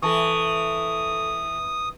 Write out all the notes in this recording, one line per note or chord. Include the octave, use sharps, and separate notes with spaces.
E3 A4 A5 C#6 D#6